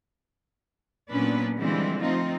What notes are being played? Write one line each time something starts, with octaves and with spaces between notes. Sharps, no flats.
A#2 F#3 B3 C#4 D4 B4
D3 E3 F3 G3 G#3 C4
F3 A3 C4 D#4 F4